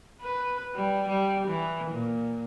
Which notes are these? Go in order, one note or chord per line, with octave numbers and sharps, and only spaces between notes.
B4
G3
G3
E3
A#2